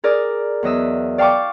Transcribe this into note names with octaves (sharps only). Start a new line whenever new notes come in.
G#4 A#4 D5
E2 F#3 D#5 E5
D5 F5 G5 A5 C#6 D6